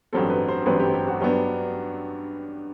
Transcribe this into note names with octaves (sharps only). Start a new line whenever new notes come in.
A1 G2 F#3 C4 A4
B4
C5
A1 G2 F#3 C4 B4
G4
G4
F#4
G2 F#3 B3 D4 G4